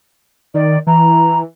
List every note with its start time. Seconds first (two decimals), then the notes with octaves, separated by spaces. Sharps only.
0.54 D#3 D5
0.87 E3 A#5